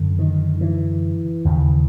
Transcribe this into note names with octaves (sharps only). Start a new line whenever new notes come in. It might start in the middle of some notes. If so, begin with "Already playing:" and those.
Already playing: F#2 D3
D#3
E3
D#2 C#3